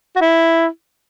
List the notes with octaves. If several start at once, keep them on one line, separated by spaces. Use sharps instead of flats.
F#4
E4